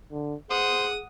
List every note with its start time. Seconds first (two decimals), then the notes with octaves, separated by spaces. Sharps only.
0.12 D3
0.50 G#4 C5 F#5 D#6